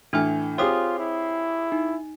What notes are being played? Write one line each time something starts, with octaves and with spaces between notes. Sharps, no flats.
A2 E3 D4 G#5 F6
C4 F4 G4 G#4 C#5 D#6
E4
D#4